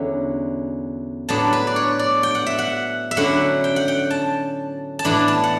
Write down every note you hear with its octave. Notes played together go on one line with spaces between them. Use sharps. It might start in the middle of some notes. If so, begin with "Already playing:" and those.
Already playing: E2 D3 F#3 C#4 E4
A2 F#3 B3 D4 A5
B4
D5
C#5
D5
G5
F#5
E5
F#5
E5
D3 F#3 C#4 E4 F#5
G5
F#5
G5
A5
A5
A2 E3 B3 D4 B5
A5
F#5